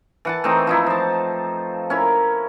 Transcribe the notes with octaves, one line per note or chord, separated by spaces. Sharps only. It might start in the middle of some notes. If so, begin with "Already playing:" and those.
E3 F#5 A5
E3 A3 C4 D#4
F3 D#4 E4
F3 A5
C#4 E4 A#4